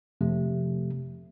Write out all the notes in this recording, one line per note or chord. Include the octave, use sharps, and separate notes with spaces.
F2 C3 F3 A3